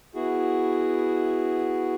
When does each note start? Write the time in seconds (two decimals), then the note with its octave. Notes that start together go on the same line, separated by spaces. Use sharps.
0.15 B3 E4 F#4 G#4